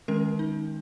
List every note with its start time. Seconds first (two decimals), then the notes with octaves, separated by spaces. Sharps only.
0.08 D#3 G#3 C#4 A#4
0.39 D#4